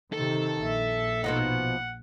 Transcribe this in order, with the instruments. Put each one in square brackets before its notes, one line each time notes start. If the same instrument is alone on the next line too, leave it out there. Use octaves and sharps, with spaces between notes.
[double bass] C3 D#3 [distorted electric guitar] A4
[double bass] A#1 [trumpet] E5
[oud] B2 F3 D#4 [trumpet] F#5